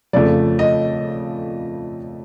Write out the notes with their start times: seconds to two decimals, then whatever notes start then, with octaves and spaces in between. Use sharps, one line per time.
0.13 F2 C#3 F3 A3 D5
0.59 D#5